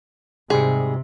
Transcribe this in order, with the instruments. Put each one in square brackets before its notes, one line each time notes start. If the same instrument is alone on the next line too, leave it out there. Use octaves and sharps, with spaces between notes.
[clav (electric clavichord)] G#2 G3 G#3 [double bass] C3 [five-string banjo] G#4